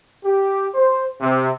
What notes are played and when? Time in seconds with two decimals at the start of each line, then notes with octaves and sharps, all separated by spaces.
0.24 G4
0.75 C5
1.21 C3